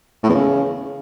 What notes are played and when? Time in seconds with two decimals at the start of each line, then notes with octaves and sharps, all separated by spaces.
0.23 A2
0.29 E2
0.35 C#3